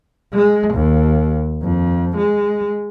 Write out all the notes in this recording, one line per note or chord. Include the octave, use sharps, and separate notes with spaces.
G#3
D#2
F2
G#3